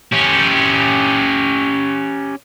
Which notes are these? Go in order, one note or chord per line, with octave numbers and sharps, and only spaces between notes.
C#4 G4